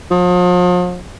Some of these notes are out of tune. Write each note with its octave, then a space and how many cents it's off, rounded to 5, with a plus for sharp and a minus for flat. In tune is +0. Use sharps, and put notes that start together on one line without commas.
F3 +40